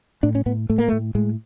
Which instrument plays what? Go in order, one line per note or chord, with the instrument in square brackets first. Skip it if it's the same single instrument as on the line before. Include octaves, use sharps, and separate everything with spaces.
[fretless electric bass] A2 D4
C#4
A2 B3
A2 A3
A#3
A3
A2
A2 G#3